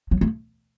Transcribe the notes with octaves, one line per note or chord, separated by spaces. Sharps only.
F#3
A3